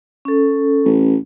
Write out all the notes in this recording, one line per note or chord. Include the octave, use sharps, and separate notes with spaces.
C#4 A4
A1